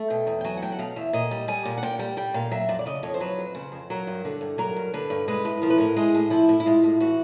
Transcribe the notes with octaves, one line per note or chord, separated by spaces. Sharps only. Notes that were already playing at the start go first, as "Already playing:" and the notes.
Already playing: A3
B2 G5
E2
G5
F#3 G#5
F#5
A3 G5
F#5
B2 F5
E2 E5
A#2 D#5
G3
G3 G#5
A#2
F#5
A#2 G5
G3 G5
G3 G5
A#2 F5
F#3 E5
F2 D5
D5
C#3 D#5
F2 C#5
C5
F#3 B4
F2
C#3 C5
F2
F#3 A#4
G2
D3
G2
F#3 A#4
G2
D3 B4
G2
G#3 B4
A2
F3 A#4
B4
A2 A#4
G#3 G#4
A2
F3 E4
A2
E4
G#3 F4
A2
E3 F#4